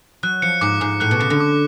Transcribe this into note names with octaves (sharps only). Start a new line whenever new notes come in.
F#3 F#6
F3 C#7
G#2 D6
G#2 D6
A2 F#6
B2
C#3 C#7
D3
D6